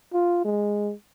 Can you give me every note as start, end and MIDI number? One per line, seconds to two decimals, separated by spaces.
0.14 0.40 65
0.45 0.93 56